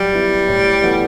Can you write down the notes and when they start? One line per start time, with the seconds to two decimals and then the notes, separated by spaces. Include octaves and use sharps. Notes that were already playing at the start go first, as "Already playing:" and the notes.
Already playing: F#3 G3
0.13 B3 E4
0.48 A2
0.83 E3 B3 F#4 A4